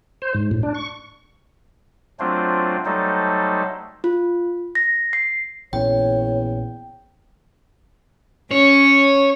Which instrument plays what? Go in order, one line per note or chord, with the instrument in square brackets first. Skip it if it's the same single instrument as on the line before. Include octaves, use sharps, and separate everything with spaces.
[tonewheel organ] C5
G#2
A2
D4
C#6
[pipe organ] F#3 A3 C4 D4 F4 C5
F#3 G3 A3 D#4 A4 C5
[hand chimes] F4
A#6
C7
[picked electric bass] A#1 A#2 C#3 [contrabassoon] E2 [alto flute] C#5 [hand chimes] G5
[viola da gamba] C#4 [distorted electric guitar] C#5